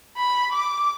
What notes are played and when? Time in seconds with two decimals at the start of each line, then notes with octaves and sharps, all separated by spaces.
0.17 B5
0.52 D6